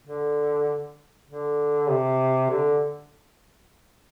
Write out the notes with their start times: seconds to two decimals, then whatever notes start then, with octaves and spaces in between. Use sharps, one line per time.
0.07 D3
1.29 D3
1.90 C3
2.51 D3